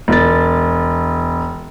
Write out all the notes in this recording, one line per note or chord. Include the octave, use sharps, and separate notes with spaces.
E1 A6